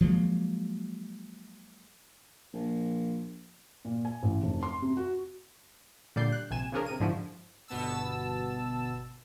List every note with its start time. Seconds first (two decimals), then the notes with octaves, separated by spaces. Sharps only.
0.01 F3 F#3 G#3 A#3
2.53 A#1
3.85 A#2
4.05 G#5
4.23 A1
4.43 F1
4.63 C6
4.82 C3
4.97 F#4
6.16 A#2 D3 G3 D5 G6 C7
6.32 F#6
6.51 A#1 C3 G#5 E7
6.72 C#3 F3 C#4 D4 G#4 A#4
6.86 C3 A#4 D#7
7.00 G#2 D3 F3 D4 E4 F#4
7.68 G1 B2 B3 A5 E6